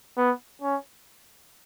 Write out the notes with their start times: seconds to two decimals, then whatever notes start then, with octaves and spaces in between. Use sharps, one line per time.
0.17 B3
0.62 C#4